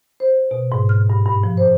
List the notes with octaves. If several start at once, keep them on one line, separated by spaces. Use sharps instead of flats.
C5
B2
G#2
F6
G2
G2
F3
C5